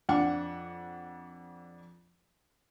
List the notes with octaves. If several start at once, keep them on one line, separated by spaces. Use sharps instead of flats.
F2 D4 F#5